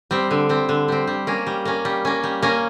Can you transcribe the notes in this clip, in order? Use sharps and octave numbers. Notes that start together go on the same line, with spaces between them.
G3 C4
D3
G3 C4
D3
G3 C4
G3
A#3 C#4
G3
A#3 C#4
G3
A#3 C#4
G3
A#3 C#4